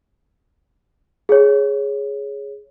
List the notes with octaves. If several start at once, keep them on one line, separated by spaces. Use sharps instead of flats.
G#4 C#5